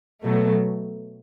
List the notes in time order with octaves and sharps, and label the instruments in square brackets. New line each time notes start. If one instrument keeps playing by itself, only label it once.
[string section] B2 F#3 A3